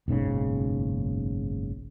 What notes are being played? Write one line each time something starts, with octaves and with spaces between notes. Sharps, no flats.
F#1 B1 G#2 C#3